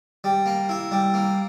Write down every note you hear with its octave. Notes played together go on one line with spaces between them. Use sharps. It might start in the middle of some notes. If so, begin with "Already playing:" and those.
G3
A#3
E4
G3
A#3